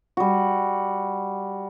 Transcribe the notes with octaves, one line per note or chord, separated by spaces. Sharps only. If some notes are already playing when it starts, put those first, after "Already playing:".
G3 F#4